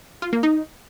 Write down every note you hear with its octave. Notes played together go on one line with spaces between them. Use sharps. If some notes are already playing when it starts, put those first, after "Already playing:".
F4
A#3
D#4